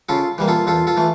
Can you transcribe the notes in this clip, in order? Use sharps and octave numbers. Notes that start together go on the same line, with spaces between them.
C#3 F4 A4
E3 G3 A#3
F4 A4
E2 F4 A4
F4 A4
E3 A3